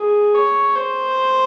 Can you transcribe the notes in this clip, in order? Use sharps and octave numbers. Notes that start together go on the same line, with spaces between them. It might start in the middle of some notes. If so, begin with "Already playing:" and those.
Already playing: G#4
C#5
C5